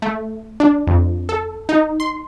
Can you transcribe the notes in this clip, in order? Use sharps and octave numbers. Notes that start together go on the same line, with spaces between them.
A3
D4
F2
A4
D#4
C6